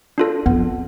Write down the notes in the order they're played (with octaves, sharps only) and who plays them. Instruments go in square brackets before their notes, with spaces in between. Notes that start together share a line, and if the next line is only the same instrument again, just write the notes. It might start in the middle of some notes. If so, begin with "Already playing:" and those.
[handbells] D4 F4 A4
[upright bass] F2 [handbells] B3